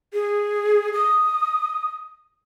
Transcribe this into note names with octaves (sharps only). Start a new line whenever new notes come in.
G#4
D#6